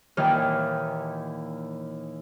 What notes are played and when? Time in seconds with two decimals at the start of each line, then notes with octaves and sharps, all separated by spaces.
0.17 D#2 A#2 D#3 E3 D#5 F6